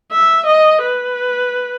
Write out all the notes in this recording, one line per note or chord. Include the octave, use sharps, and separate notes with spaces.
E5
D#5
B4